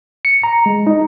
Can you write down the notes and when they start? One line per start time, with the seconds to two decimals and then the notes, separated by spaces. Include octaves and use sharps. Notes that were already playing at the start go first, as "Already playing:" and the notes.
0.25 C#7
0.43 A#5
0.66 G#3
0.87 D#4